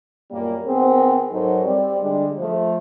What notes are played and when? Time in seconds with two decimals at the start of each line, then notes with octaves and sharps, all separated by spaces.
0.31 F#2 A#2 G3 A#3
0.67 D#3 B3 C4 G#4 A#4 C5
1.31 G#2 F#3 D#4 A4 A#4 C5
1.64 G3 C4 D5
2.01 D3 G3 G#3 D4
2.38 F3 A3